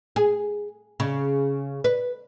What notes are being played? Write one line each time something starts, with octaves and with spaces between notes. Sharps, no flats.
G#4
C#3
B4